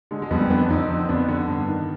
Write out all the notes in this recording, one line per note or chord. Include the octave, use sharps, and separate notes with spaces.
D3 G#3
G#3
F2 G3 B3
D3 B3 D4
F2 C4 D#4
D3
F2 B3 D4
D3
G2
D#3